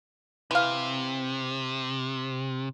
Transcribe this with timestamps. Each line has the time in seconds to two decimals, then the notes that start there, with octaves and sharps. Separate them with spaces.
0.51 C3 E3 F5